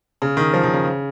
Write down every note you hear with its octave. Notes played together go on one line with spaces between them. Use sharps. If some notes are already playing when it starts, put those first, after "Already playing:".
C#3
D#3
F3
D#3
C#3